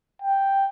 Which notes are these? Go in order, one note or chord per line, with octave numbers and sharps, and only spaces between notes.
G5